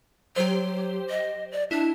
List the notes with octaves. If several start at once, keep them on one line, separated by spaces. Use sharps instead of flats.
F#3 G4 C5
D#5
D5
D4 E4